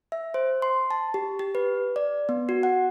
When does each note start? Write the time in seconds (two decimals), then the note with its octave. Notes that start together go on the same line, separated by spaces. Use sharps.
0.12 E5
0.34 C5
0.62 C6
0.91 A5
1.14 G4
1.39 G4
1.55 B4
1.96 D5
2.29 B3
2.49 F#4
2.63 F#5